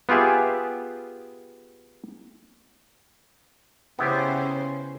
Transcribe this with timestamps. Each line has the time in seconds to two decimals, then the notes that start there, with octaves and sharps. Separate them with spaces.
0.09 B3 F4 G4 G#4 E5
3.99 C#3 B3 C#4 E4 G4 C5